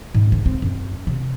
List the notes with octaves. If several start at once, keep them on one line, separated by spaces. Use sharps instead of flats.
G#2
C#3
C4
F#2
C3